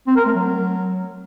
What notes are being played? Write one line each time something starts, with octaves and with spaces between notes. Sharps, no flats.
C4
A#4
A3
F#3